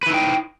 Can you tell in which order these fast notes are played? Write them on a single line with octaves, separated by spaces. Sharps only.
B4 E4 D#4 G5